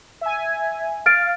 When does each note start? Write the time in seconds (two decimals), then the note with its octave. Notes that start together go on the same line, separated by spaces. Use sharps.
0.21 E5 G#5
1.06 F5 F6 A6 D7